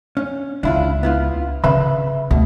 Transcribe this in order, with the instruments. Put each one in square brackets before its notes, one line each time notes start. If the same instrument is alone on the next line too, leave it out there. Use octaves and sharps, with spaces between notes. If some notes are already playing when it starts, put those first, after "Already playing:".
[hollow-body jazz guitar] C#4
[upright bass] C#2 [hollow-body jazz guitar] D4 E4 F4
[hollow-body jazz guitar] B3 E4 F4
[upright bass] C#3 D4 [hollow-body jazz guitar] B4 E5 B5
[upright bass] D2 [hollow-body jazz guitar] B2